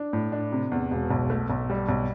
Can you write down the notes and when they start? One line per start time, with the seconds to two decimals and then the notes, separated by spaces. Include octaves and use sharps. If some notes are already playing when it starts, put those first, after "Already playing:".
Already playing: D4
0.13 A2
0.32 D4
0.52 C3
0.72 E2
0.91 E1
1.11 B1
1.30 A3
1.50 B1
1.70 G3
1.89 B1